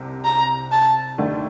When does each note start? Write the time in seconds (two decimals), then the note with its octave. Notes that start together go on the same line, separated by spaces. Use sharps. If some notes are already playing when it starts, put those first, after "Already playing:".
Already playing: C2 C3
0.25 A#5
0.72 A5
1.18 D#2 D#3 A3 D4